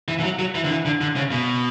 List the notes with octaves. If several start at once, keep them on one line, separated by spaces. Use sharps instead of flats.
E3
E3
F#3
F#3
E3
D3
E3
D3
D3
C#3
B2